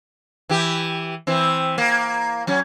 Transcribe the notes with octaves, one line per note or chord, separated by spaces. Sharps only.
E3 G4
E3 C4
A#3
F#3 C#4